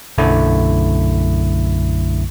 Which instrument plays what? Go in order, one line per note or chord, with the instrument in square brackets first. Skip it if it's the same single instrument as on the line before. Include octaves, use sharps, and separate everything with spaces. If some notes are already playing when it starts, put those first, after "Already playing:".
[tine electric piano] B1 F#2 D3 A3 E4